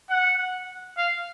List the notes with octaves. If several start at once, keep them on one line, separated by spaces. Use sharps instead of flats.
F#5
F5